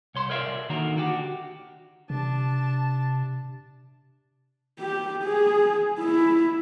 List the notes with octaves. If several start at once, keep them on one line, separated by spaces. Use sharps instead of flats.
C2 C#5 C6
A#4 C#5 D5 E5 F5
D3 D#3 A#3 F#4 A#4
D4 F#4 G4
C3 D4 A5
G4
G#4
E4